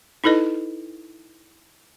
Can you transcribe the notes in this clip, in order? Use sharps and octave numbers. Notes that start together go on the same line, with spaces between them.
D#4 E4 A4 B4 D#5